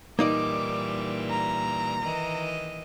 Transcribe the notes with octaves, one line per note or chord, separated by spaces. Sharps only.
A#2 E3 G3 A#3 D#4 D5 D6
A#5
D#3 E3 D#5